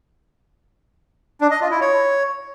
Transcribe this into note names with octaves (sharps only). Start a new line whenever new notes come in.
D4
D#5
F4
E4
C#5